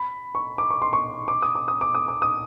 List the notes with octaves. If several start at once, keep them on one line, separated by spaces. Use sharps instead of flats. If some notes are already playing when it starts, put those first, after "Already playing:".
Already playing: B5
C#6
D6
C#6
C6
C#6
D6
D#6
D6
D#6
D6
D#6
D6
D#6